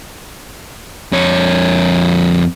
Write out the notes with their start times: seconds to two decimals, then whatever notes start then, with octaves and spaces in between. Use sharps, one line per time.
1.13 F2 C#5